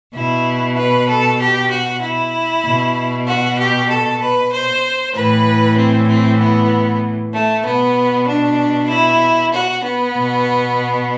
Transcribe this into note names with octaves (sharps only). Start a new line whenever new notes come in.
B2 E4
B4
A4
G4
F#4
E4
B2
F#4
G4
A4
B4
C5
A2 E3 B4
C4
C4
B3
A3
B2 B3
D4
E4
F#4
B3
B2